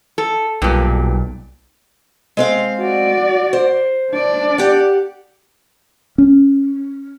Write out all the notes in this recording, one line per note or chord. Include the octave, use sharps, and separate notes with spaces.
A4
B1 G2 A#2
G#3 C4 F5
F#4 D5
C5
D4 D5
G4 F#5
C#4